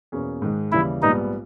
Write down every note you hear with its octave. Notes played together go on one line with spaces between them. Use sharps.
E2 B2 A#3 C#4 G#4
G#2 D#3 G#3
D#2 C#3 E3 G3 E4
A#1 G#2 G3 B3 D#4